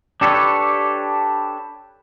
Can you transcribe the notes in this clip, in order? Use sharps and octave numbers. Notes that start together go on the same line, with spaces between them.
D4 G4 A4 B4 C#5